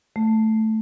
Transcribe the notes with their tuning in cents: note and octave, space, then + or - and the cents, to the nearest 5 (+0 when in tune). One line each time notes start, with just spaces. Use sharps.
A3 -5